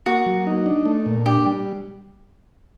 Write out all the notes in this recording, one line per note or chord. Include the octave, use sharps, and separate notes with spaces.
A#3 F#4
F#3
D#4
D4
A3
A#2
D4 G4
G3